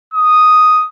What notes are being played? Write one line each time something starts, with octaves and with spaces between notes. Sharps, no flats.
D#6